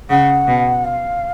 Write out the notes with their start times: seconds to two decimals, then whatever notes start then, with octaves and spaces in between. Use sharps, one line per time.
0.10 C#3 F#5
0.47 B2
0.84 F5